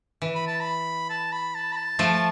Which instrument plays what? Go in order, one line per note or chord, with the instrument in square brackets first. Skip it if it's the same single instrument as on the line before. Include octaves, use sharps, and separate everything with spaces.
[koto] E3
[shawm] B5
A5
B5
A5
B5
A5
B5
A5
[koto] F3 A3